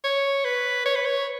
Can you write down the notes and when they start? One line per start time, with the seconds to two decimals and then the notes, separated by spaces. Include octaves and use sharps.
0.04 C#5
0.45 B4
0.86 C#5
0.95 B4
1.05 C#5